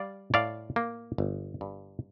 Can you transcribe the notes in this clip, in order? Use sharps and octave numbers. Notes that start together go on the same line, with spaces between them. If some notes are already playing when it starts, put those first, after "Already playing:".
Already playing: G3 D5 F5
A2 D5 F5
A#3
G1
G2